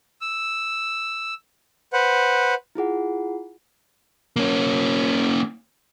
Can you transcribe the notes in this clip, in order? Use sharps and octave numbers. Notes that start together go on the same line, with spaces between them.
E6
B4 C5 F#5
E4 F4 G#4 F#5
A#3 C#4